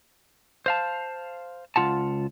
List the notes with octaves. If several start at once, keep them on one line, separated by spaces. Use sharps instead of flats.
C5 F5 A5
C#2 F4 F#5 A5